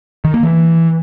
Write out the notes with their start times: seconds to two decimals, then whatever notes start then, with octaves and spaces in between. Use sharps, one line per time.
0.25 D#3
0.34 A#3
0.43 E3